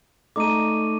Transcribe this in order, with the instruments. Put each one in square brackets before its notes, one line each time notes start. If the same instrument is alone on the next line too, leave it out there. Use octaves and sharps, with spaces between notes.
[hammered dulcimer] A3 D#4 [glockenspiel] D6 D#7